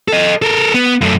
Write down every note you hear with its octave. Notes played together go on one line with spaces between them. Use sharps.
A4 D#5
A4 A#4
B3
F#2 A3